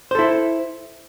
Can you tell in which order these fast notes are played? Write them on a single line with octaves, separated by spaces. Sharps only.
C5 A4 E4